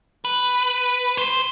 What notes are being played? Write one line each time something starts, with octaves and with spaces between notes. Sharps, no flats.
B4
C5